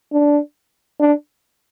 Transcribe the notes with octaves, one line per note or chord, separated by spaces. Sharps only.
D4
D4